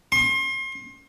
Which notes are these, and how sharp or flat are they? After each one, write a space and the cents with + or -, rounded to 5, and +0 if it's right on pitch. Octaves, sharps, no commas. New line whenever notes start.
C6 +35